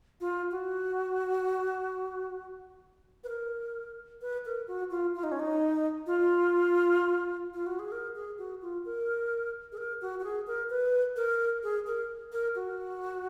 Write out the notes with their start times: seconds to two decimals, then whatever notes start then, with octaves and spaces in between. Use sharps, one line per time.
0.20 F4
0.51 F#4
3.24 B4
3.29 A#4
4.21 B4
4.45 A#4
4.67 F#4
4.91 F4
5.15 F4
5.23 D#4
5.32 C#4
5.40 D#4
6.06 F4
7.54 F4
7.66 F#4
7.79 G#4
7.92 A#4
8.15 G#4
8.38 F#4
8.62 F4
8.85 A#4
9.72 G#4
9.77 A#4
10.01 F#4
10.19 F#4
10.24 G#4
10.47 A#4
10.70 B4
11.16 A#4
11.63 G#4
11.87 A#4
12.32 A#4
12.55 F#4